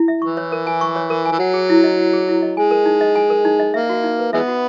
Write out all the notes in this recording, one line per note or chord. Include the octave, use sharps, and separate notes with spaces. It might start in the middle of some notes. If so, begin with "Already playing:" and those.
Already playing: E4
E5
E3 C#6
C#5
A#4
G#5
C#6
C#5
A#4
G#5
E3
F#3 F#5
G#4
E4
D#5
F#5
G#4
E4
D#5
G#3 G#5
A#4
D#4
D#5
G#5
A#4
D#4
D#5
A#3 E5
F#4
D#4
B4
E3 G#3 B3 E5
F#4